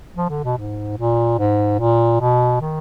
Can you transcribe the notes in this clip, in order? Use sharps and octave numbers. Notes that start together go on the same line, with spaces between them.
F3
D3
B2
G#2
A#2
G#2
A#2
B2
D#3